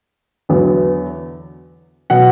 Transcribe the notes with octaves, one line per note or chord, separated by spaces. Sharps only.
E2 D3 F#3 B3
B2 F#3 F#5